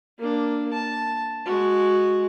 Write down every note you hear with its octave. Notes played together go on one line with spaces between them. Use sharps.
A#3 D4
A5
G#3 F#4